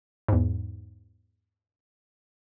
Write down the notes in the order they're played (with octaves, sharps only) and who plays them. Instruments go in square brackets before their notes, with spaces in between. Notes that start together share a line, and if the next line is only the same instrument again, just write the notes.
[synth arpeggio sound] E2 G#2